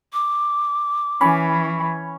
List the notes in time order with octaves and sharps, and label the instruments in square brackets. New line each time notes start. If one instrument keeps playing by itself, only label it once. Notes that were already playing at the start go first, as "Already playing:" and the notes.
[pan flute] D6
[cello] E3 [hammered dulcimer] C#4 [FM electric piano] B5